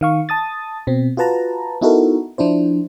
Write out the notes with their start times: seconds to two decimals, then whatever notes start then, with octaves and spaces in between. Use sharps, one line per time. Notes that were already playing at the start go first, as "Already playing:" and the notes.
0.01 D#3 F5 C#6
0.29 A5 D#6 A6
0.87 B2 C4
1.17 F4 F#4 B4 A5 A#5
1.81 B3 D#4 E4 F#4 A4 A#4
2.38 F3 D4 E4 C5